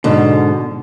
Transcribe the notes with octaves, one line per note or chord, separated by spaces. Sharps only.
G#2 B2 D3